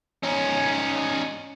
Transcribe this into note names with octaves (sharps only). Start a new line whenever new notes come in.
C#4 D#4